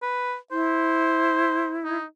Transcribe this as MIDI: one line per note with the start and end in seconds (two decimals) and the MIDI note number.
0.02 0.35 71
0.51 1.97 64
0.51 1.76 72
1.85 2.04 63